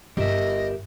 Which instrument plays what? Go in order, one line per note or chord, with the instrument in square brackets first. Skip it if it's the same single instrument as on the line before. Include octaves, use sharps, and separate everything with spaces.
[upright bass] G1 [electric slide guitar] G4 A#4 E5 [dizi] D#5